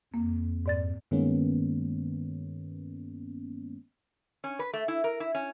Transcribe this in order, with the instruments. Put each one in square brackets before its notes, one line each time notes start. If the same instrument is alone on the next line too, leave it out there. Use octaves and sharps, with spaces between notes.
[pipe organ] F2 [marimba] A#3
[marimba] G#2 D5 A6
[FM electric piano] G2 D#3 G#3 A#3 B3 C#4
[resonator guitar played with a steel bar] C#4
B4
A3
E4
A#4
E4
C#4